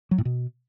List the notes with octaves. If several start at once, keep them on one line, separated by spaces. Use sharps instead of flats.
F#3
A2
B2